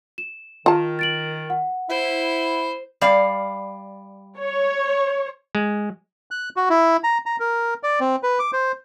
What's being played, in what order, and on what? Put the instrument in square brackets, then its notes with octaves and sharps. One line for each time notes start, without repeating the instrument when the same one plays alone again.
[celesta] E7
[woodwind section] D#3 [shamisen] F4 A5
[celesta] A6 D7 F#7
F#5
[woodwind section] E4 [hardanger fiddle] C5
[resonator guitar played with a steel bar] G3 D5 F5
[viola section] C#5
[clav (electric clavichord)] G#3
[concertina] F#6
F#4
E4
A#5
A#5
A#4
D5
C4
B4
D6
C5